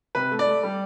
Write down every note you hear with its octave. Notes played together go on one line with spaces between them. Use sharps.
C3 B4
A3
D5
A3
G3